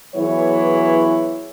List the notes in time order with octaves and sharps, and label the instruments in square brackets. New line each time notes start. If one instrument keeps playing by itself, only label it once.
[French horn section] E3 F#3 B3 E4 G#4 C#5